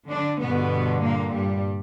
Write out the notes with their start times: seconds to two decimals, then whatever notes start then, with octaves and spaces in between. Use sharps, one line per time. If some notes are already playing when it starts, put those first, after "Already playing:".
0.10 D3 D4
0.41 G2 B2 D3 B3
1.03 A#2 A#3
1.34 G2 G3